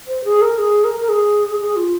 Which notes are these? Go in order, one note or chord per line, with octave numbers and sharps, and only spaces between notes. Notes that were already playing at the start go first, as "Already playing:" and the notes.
C5
G#4
A#4
G#4
A#4
A#4
G#4
G#4
F4